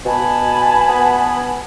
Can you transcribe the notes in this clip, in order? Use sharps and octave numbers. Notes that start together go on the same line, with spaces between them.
B2 G#5 A5 B5
B3